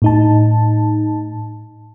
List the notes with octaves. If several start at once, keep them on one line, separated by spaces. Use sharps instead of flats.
A2 D#4 A5